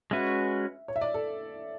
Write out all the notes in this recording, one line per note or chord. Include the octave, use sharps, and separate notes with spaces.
G#3 C#4 F#4 B4 E5
C#5
E5
D5
A4